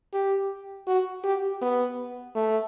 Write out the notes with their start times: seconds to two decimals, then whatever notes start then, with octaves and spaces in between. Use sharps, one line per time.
0.13 G4
0.87 F#4
1.24 G4
1.62 B3
2.35 A3